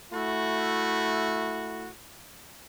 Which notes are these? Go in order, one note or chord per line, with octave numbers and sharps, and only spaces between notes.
A3 E4 F#4